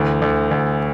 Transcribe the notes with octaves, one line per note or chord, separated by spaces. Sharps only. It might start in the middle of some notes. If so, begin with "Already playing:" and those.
Already playing: D2 E3
D2
D2